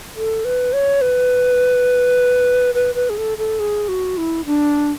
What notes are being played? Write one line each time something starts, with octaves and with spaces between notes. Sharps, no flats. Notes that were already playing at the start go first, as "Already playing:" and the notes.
A4
B4
C#5
B4
B4
B4
G#4
A4
A4
G#4
F#4
E4
D4